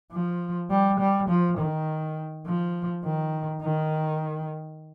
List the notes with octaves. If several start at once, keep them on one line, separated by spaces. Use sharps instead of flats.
F3
G3
G3
F3
D#3
F3
D#3
D#3